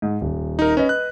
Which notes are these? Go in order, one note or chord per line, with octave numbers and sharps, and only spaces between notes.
G#2
D#1
D#4 A#4
C#4 B4 D#5
F#6